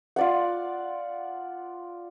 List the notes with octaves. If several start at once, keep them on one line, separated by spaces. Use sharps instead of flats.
F4 D5 F#5